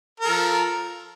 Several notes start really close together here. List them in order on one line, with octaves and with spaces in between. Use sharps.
A#4 A4 F3